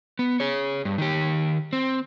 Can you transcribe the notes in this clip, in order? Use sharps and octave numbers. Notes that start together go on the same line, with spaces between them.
B3
G#4 C#5
G2
D#3 G4
C4